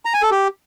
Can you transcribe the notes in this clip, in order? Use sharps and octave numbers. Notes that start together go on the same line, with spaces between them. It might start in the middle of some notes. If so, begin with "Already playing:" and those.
A#5
G#5
A4
G4